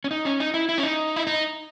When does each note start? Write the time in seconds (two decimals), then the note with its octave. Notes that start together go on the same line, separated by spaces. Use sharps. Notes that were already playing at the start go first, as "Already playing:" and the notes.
0.04 C#4
0.11 D#4
0.25 C#4
0.40 D#4
0.54 E4
0.69 E4
0.78 C#4
0.83 D#4
1.16 E4
1.27 D#4